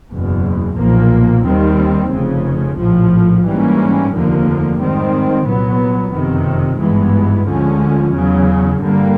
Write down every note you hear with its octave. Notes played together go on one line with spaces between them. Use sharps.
F#1 E2 B2
B1 A#2 F3 A#3
D#2 D#3 G3 C4
F1 F2 C#3
A#1 A2 F3
G#2 E3 G3 A#3 C#4
F1 D#2 D3 F3 A#3
G#2 D#3 G3 C4
C2 A#2 F#3 B3
F#1 F2 C3 D#3
G#1 G2 E3 G#3 B3
D2 D3 F3 G#3 C#4
E2 C#3 F#3
G2 D3 G3 A#3